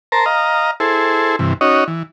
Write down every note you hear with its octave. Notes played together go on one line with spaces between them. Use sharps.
A#4 C5 A5 A#5
D#5 F5 A#5
E4 G#4 A4 C5
G2 C3 E3
C#4 D#4 F#4 C#5 D#5
E3